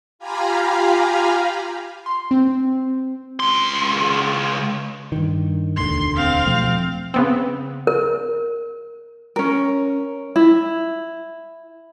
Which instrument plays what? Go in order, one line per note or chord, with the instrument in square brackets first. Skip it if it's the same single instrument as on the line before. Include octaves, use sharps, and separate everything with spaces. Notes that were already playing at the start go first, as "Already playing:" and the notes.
[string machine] F4 G4 F5 G#5 A#5 B5
[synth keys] C6
C4
[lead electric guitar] C#2 C6
[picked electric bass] G2 D#3
[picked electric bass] E1 D2 D3 [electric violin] C6
[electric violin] C4 F5
[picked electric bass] B2 F3 A3
[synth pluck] C#3 B3 C4
[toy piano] A#4
[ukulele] C#4 A#4
E4